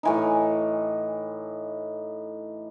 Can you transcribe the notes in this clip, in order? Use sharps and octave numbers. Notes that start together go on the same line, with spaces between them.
A2 E3 D#4